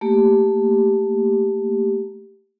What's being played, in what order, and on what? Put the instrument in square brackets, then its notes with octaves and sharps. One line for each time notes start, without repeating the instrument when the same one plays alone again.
[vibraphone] A3 A#3 G4